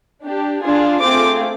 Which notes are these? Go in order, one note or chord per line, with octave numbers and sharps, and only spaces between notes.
D4 G4
D4 F4 G#4
A3 C4 F4 G#4 D6